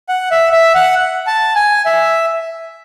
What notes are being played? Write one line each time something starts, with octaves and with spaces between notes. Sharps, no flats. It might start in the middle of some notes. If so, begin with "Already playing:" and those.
F#5
E5
E5
F#5
A5
G#5
E5